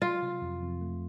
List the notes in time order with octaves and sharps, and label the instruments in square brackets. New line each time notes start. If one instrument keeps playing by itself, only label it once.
[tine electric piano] F#3 [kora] F4
[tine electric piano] C3
F2
F2
A3